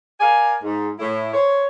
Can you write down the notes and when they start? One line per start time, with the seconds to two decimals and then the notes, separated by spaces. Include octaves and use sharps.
0.20 A#4 D5 F5 G#5
0.63 G#2
0.99 A2 E4
1.32 C5 C#5